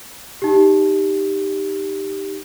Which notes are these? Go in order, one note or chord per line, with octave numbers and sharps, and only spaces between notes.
D#4 G4